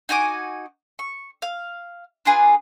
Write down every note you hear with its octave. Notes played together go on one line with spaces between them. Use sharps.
D#4 F#4 G#5 D6
C#6
F5
D4 F4 G#4 B4